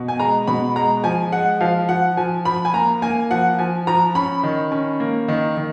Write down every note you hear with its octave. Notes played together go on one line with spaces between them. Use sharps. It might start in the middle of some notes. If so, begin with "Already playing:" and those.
Already playing: B2
G#5
G#3 A#5
B2 B5
G#3 A#5
F3 G#5
G#3 F#5
F3 F5
F3 F#5
F3 G#5
F3 B5
G#5
A#3 A#5
A#3 G#5
F3 F#5
F3 G#5
F3 A#5
C#4 B5
D#3
C#4
A#3
D#3
D#3